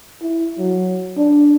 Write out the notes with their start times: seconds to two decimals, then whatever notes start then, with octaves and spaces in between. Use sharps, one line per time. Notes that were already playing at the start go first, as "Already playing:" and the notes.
0.22 E4
0.59 F#3
1.17 D4